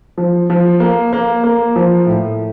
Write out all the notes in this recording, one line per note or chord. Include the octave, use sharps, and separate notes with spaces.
F3
F3
A#3
A#3
A#3
F3
A2